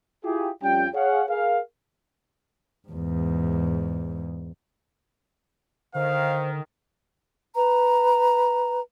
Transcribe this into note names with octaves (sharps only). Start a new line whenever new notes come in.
E4 F4 G4 G#4
F2 G3 C#4 F4 G5
G#4 C#5 F5 F#5
G#4 A#4 F5
E2 G#2
D3 D#3 C5 F5
B4 A#5